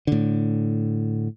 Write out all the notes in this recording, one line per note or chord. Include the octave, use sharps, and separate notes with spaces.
A2 D3